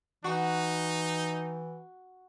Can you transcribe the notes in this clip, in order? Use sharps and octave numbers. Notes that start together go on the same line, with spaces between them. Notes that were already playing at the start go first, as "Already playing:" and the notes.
E3 D#4 F#4